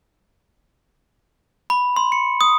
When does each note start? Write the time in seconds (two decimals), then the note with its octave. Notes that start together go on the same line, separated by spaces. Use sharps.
1.70 B5
1.96 C6
2.12 C#7
2.41 D#6